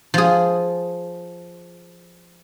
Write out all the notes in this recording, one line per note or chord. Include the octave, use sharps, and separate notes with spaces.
F3 G#4